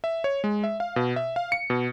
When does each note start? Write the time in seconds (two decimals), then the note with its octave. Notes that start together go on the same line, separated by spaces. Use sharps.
0.04 E5
0.24 C#5
0.44 G#3
0.64 E5
0.80 F5
0.96 B2
1.16 E5
1.36 F5
1.52 C#7
1.70 B2